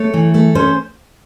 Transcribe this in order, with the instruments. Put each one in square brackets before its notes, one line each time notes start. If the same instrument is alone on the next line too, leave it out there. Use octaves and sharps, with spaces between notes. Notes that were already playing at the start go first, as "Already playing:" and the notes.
Already playing: [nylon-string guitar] A3 C#5
E3
A3
C#4 C5